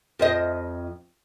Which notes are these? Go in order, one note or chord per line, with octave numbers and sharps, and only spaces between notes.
F2 C5 D#5